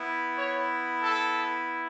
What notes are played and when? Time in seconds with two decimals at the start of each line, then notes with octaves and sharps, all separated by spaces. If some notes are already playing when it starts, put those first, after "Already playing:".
Already playing: B3 E4
0.37 C#5
1.02 A4